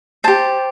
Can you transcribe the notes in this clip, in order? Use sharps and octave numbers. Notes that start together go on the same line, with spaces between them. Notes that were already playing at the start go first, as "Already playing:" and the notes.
G4 C5 A5